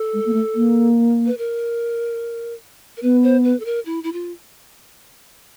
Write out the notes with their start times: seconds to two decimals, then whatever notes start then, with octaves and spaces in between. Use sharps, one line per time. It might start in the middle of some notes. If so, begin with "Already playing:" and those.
Already playing: A4
0.14 G#3
0.26 A#3
0.34 A3
0.55 A#3
1.26 B4
1.38 A#4
2.97 A#4
3.02 B3 B4
3.23 C5
3.44 B4
3.60 A4
3.65 A#4
3.86 E4
4.04 E4
4.13 F4